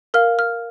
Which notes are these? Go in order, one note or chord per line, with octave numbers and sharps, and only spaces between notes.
A#4 F5 F6
F6